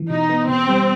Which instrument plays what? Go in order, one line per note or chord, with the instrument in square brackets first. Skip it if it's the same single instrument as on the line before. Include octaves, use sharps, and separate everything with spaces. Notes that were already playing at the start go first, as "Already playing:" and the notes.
Already playing: [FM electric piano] E3
[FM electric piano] B2 [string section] D#4
[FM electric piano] B3
[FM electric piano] B2 [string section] C4
[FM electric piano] G3